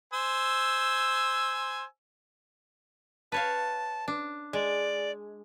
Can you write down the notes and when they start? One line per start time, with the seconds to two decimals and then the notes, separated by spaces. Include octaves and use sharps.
0.13 C5 G#5 E6
3.32 B4 C#5 F5 A5
4.08 D4
4.53 G#3 D5